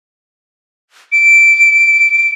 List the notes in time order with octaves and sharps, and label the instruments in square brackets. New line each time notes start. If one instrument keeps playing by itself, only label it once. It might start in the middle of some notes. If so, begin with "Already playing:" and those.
[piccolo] D7